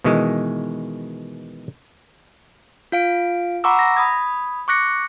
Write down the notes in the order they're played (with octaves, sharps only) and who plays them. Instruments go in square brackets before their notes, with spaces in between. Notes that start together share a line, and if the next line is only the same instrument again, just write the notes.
[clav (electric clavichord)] B2 D#3 E3 G#3
[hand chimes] F4 F5 D7
F#5 A#5 B5 C#6 D6 E6
A#6
B5 D#6 G#6
C#6 D6 F#6 A#6 C#7